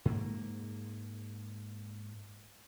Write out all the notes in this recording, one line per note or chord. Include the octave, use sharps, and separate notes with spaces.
G#2 A#3